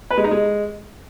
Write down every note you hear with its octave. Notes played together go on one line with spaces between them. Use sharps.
B4
G#3
D#4
G#3